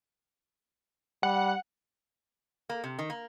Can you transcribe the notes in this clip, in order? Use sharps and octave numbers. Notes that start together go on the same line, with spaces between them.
G3 F#5
A#3
C3
D#3
A#3